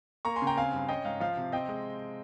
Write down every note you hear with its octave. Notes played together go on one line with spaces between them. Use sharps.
A#3 A#5 C#6
G#5 C6
C#3
G5 A#5
C4 F5 G#5
G2
C#4 D#5 G5
G#2 F5
F3 F5
C3
C4 D#5 G5
G#3